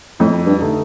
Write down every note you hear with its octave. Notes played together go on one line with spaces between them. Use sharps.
F2 A2
G2
D3 A3 D#4